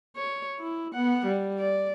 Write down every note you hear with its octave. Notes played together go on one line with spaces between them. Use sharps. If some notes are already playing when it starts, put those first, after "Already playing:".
C#5
E4
B3 F#5
G3
D5